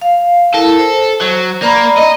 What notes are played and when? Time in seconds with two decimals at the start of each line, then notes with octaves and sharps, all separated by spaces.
0.02 F5
0.54 E4 A4 A#4
0.79 C5
1.21 F#3
1.62 A#3 D5 A#5 B5
1.97 D#5